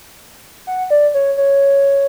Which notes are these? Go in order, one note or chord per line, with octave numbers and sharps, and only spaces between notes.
F#5
D5
C#5
C#5